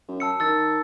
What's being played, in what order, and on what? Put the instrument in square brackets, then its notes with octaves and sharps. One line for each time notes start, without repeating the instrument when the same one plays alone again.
[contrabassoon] F#2
[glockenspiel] A5 E6 C#7
[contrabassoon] D#3 [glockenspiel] E6 A6